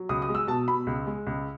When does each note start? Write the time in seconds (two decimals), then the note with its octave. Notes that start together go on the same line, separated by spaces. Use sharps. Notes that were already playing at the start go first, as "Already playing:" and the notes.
Already playing: F#3
0.09 C#2 D#6
0.22 D#6
0.29 G#3
0.35 E6
0.47 B2 A5
0.68 B2 B5
0.87 C#2
1.07 G#3
1.27 C#2